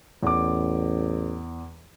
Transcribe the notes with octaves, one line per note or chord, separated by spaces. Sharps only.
A1 E2 D6